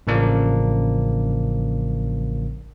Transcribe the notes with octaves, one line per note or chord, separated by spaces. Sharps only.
A1 C#3 F3 A#3 D4